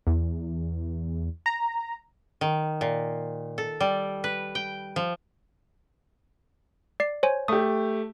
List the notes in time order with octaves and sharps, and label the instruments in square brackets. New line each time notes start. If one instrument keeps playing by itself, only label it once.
[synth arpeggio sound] E2
A#5
[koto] D#3
A#2
A4
G3
B4
G5
F3
[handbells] D5 C7
C5 C#5 G#5
[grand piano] A3 G4 [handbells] D#6